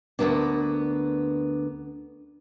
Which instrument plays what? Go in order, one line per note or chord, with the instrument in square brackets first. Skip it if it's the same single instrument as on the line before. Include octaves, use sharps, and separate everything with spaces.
[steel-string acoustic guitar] D2 G#2 A#3 B3 D4